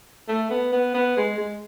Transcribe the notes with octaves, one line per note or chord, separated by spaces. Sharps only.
A3
B3
B3
B3
G#3
G#3